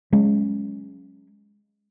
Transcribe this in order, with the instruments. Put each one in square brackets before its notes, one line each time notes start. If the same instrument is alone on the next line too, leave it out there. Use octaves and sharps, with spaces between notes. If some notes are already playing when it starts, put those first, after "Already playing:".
[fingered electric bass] F#3 G#3 C#4